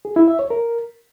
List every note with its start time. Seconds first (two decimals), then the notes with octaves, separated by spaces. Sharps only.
0.05 G#4
0.16 E4
0.28 E5
0.39 C#5
0.50 A#4